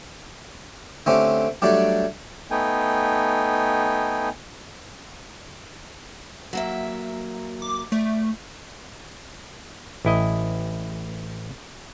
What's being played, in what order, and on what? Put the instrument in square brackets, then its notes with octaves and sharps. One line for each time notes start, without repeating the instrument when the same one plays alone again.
[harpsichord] D3 A3 C4 C#4 G4
F#3 G3 A3 D4 G4
[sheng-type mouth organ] A3 B3 D#4 G5 G#5
[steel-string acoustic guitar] F#3 A#3 E5
[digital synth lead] D6
[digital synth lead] A3 [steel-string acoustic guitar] D5
[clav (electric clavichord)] A1 E4 D#5